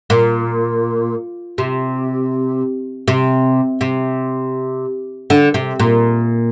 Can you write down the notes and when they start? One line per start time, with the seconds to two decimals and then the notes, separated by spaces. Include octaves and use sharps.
0.10 A#2
1.58 C3
3.08 C3
3.81 C3
5.30 D3
5.54 C3
5.79 A#2